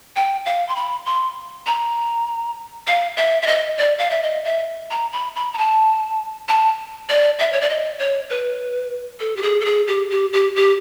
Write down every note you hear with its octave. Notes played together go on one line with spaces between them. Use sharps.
G5
F5
C6
B5
C6
A#5
F5
E5
E5
D#5
D5
F5
E5
D#5
E5
A#5
B5
B5
A#5
A5
A5
D5
E5
C#5
D5
D#5
C#5
B4
A4
G4
G#4
A4
G#4
G4
G4
G4
G4